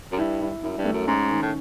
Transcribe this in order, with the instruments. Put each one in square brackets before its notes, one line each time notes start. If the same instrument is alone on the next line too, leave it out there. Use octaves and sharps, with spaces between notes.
[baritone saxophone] F#2
[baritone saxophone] G2 [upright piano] E4
[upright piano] E4
[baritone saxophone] F#2 [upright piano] E4
[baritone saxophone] G2
[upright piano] A3
[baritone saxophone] F#2
[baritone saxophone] G#2 [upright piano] C#4
[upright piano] D#3
[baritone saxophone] A2